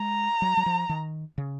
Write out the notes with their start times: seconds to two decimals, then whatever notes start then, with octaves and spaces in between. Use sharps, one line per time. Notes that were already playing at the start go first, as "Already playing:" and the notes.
Already playing: G#3 A#5
0.42 F#3
0.57 F#3
0.66 F3
0.89 D#3
1.38 C#3